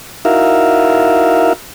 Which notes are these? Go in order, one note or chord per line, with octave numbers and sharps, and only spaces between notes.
D#4 E4 F#4 A#4 E5 F5